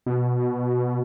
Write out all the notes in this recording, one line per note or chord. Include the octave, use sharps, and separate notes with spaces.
B2